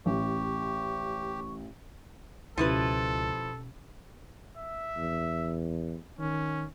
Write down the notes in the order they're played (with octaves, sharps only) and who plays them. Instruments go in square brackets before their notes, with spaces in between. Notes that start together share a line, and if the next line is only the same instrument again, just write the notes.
[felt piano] A1 [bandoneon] G4 [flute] C#6
[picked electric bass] C#2 [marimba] B2 C#4 G4 [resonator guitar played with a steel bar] F3 E4 B4 [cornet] A4
[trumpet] E5
[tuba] E2
[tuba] D#3 [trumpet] C#4